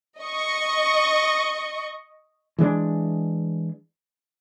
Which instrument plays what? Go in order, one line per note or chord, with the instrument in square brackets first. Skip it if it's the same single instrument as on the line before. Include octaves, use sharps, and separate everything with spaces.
[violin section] D#5 C#6
[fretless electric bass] E3 G#3 C4 D4